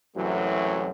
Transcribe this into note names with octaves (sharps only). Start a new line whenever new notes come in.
C2 F#2 E3 F#3 A3